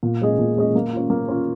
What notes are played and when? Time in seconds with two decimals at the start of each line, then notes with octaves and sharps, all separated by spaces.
0.03 A#2
0.22 G#3 C#4 G#4 D#5
0.39 A#2
0.57 G#3 C#4 G#4 D#5
0.75 A#3
0.93 C#4 F4
1.10 A#3
1.28 C#4 F4